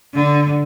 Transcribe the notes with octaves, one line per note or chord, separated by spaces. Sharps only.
D3